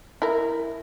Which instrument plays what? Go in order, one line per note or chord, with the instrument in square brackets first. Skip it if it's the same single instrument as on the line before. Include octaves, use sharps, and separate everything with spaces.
[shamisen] E4 A#4